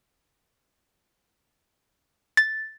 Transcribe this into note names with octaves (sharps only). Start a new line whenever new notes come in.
A6